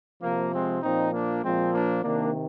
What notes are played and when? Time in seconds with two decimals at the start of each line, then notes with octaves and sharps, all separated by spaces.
0.22 C3 F3 A#3
0.52 G#3 C4
0.82 A#2 F3 C4 D#4
1.13 A#3 D4
1.43 A#2 F3 G#3 C4
1.73 A#3 D4
2.03 C3 D#3 A#3 D4